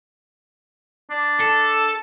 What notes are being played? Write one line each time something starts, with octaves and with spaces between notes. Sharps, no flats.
D4
A4